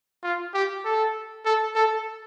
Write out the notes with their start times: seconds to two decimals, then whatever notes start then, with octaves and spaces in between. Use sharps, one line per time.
0.23 F4
0.54 G4
0.85 A4
1.45 A4
1.75 A4